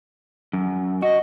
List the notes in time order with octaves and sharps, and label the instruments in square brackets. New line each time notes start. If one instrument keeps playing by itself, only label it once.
[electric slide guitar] F#2
[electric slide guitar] F#4 [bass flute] D#5